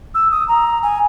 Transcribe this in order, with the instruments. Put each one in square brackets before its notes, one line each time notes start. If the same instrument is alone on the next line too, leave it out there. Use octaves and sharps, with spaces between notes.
[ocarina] E6
D#6
A#5
G#5